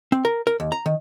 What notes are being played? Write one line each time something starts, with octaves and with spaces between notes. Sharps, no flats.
C4
A#4
A#4
D#2
A#5
D#3